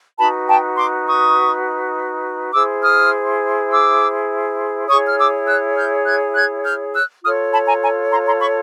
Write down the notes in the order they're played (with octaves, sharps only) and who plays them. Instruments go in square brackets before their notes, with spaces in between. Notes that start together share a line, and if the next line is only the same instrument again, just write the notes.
[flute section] D#4 F#4 B4 A5 B5
G5 A5
C6 D6
C#6 D#6
E4 G#4 C5 D6 E6
D#6 F6
D6 E6
E4 G#4 C#5 C#6 D#6
F6
D6 E6
E6 F#6
F6 G6
F#6 G#6
F#6 G#6
F6 G6
E6 F#6
F4 A4 C#5 D#6 F6
A5 B5
G#5 A#5
G#5 A#5
A#5 C6
A#5 C6
B5 C#6